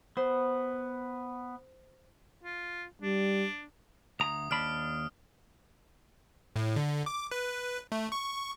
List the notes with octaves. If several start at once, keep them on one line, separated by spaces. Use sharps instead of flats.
B3 C5
F4
G3 D4
D2 A#5 D#6
D#2 D4 B5 F6
A2
D3
D6
B4
A3
C#6